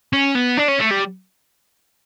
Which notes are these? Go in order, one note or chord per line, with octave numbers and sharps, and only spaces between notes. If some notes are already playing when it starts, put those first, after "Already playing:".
C#4
B3
D4
C#4
A3
G3